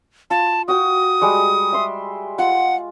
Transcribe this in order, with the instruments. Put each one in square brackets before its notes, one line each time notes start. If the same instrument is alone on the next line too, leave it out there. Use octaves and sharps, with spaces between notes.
[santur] F4 [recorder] A5
[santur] F#4 G5 [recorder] D#6
[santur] G3 G#3 C#6
E5 C6
[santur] F4 [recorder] F#5